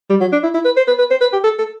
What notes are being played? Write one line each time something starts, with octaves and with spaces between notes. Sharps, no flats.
G3
F#3
D4
E4
E4
B4
C5
B4
B4
C5
B4
G4
A4
A4